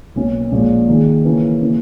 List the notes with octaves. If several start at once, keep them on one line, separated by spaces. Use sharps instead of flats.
B1 B2 A#3 C#4
A#1 A#2 G#3 C#4
D#3 A#3 D#4 G#4
C#3 E3 A#3 C#4
C#3 E3 A#3